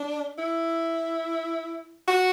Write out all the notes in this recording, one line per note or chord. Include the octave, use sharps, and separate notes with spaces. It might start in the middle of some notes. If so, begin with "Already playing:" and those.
Already playing: D4
E4
F#4